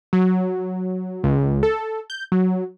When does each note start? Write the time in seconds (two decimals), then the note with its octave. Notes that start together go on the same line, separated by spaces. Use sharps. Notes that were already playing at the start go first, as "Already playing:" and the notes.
0.13 F#3
1.24 C#2
1.63 A4
2.10 G6
2.32 F#3